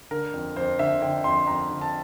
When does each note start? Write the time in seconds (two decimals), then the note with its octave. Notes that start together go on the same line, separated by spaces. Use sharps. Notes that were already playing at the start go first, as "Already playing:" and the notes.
0.11 D3 A#4
0.34 F2
0.56 F2 C5
0.79 D3 E5
1.02 D3 G5
1.24 F2 C6
1.47 F2 A#5
1.70 D3
1.81 A5